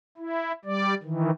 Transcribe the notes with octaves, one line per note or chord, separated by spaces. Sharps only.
E4
G3 D5
D#3 E3